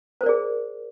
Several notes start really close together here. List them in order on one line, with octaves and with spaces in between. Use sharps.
C5 A#4 D5 G#4